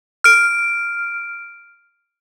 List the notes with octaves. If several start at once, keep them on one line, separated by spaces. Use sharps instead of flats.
F6 D7